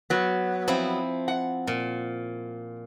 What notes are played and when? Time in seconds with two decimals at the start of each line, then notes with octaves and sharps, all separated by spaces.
0.10 F#3 B3
0.68 F3 C4 E4
1.28 F#5
1.67 A#2